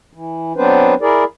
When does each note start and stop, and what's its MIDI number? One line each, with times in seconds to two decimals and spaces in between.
0.13 0.53 52
0.56 0.94 54
0.56 0.94 59
0.56 0.94 60
0.56 0.94 62
0.56 0.94 71
0.56 0.94 72
1.01 1.24 64
1.01 1.24 68
1.01 1.24 70
1.01 1.24 74